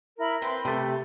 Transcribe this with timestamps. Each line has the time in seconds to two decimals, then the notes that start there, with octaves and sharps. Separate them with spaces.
0.19 E4 A#4 B5
0.42 C4 B4 C6
0.65 C3 A3 G4 B4